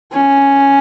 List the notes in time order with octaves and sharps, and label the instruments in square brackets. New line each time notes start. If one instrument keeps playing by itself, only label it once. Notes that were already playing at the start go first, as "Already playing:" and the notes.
[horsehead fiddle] C#4